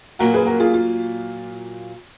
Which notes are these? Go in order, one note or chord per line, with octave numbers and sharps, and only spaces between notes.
A#2 F#3 A#3 F#4 A#4
G#4 B4
F#4 A#4
F4 G#4
F4